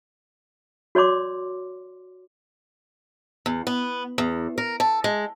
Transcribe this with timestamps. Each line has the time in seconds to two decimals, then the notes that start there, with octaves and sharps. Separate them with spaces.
0.95 F#4 C#5 D5 C6 D6
3.46 E2
3.67 B3
4.18 E2
4.58 A#4
4.80 A4
5.04 G#3